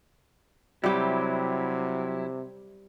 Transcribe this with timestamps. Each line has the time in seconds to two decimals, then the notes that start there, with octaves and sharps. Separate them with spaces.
0.84 C3 F#3 G3 E4 G4